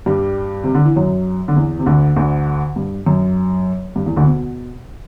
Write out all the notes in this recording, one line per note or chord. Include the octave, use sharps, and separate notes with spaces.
G2 G3
C3
D3
E3
F#2 F#3
D3
E2 E3
C3
D2 D3
D2 D3
G2
F#2
G2
E2 E3
D2 D3
B2